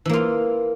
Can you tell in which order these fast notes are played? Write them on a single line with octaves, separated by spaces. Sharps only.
E3 A#3 F4